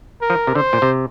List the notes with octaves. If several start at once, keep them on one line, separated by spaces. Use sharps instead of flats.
A#4
F3
C3
D3 C5
A#2
C3